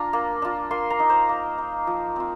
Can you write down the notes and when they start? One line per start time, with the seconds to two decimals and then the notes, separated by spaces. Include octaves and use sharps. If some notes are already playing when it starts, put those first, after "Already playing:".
Already playing: D4 F4 A#5
0.13 A#3
0.42 D4 F4
0.71 A#3 C6
0.90 A#5
1.00 D#4
1.10 C5
1.29 A#3
1.58 D#4
1.87 F3
2.16 C4 F4